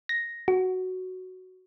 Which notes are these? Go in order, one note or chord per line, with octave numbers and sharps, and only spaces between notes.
A#6
F#4